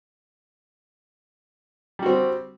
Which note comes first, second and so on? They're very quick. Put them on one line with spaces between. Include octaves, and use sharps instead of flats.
G3 F#4 C4